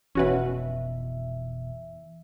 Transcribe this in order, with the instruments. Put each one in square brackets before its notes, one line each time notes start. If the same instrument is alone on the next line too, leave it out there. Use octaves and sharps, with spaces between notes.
[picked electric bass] F1 B2 [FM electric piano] E3 E5 [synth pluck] C#4 F#4 B4